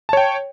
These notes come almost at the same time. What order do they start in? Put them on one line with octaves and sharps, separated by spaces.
A5 C#5 G5